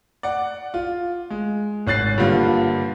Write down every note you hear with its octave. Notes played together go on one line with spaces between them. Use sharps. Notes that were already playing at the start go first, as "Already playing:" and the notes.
D5 F#5
F4
G#3
G#1 C#4 F#6 A6 C7
G2 A#2 D3 G3 F4